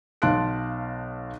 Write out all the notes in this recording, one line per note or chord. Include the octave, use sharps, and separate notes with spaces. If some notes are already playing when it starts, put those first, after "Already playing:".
B1 F5 A5 C6 F#6 D7